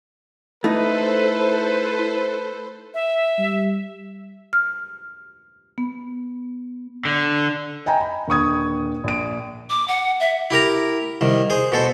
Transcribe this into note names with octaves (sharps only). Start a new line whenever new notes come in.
A3 D#4 E4 A4 B4 C5
E5
G3
F6
B3
D3
D#5 G5 G#5 A#5
B5
D#1 D3 C#6 D#6 G#6
A#1 D7
D6
F#5
E5
E4 G4 A#4 A#5
C2 D#3
G#4 C5
B2 A4 C5